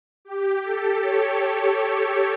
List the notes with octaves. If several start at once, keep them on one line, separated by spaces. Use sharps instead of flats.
G4
A4
C#5
C#5